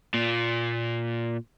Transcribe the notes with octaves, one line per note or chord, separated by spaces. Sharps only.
A#2